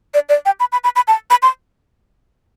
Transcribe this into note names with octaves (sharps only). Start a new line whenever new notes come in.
D5
D5
G5
B5
B5
B5
B5
A5
B5
C6